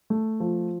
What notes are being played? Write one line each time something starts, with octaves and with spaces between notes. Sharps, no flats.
A3
F3